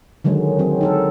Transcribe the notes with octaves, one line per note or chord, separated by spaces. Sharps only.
D3 D#3 F#3 G#3
F#3 C4
D#4 A4 A#4